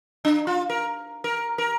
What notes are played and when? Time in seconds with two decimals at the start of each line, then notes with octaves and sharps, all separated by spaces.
0.25 D4
0.47 F4
0.70 A#4
1.24 A#4
1.58 A#4